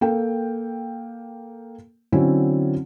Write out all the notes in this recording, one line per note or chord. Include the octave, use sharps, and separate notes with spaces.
A#3 A4 G5
D3 F#3 C4 C#4 E4